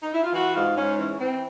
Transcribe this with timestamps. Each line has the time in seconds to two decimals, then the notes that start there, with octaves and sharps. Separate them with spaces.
0.03 D#4
0.13 E4
0.23 F4
0.33 E3 F#4
0.54 G#2 F4
0.75 G#2 C#4
0.98 E3 C#4
1.18 E3 C4